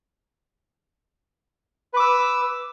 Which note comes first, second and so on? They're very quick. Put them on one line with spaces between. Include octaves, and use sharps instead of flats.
B4 D6 E6